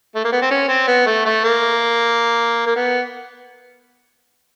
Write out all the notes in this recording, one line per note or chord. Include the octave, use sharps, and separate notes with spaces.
A3
A#3
B3
C4
C#4
C4
B3
A3
A3
A#3
A#3
B3